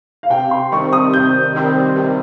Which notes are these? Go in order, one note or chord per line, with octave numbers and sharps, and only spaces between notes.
F5
C3 G5
C6
D#3 G3 C4 C#6
D#6
C3 G6
D#3 G3 C4
C3